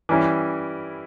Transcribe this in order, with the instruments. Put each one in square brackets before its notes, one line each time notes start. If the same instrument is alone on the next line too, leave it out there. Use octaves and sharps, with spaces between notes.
[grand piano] E3 G3 C#4 E4